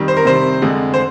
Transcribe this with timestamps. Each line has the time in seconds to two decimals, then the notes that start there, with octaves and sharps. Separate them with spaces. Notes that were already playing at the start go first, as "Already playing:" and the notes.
Already playing: F2 D#3 G3
0.08 C5
0.17 A#4
0.25 C3 D#3 G3 C5
0.62 F2 D3 G#3
0.94 C5